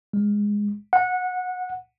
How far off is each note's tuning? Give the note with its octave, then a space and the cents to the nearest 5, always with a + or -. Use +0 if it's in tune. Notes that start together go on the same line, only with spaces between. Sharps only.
G#3 -10
F#5 -20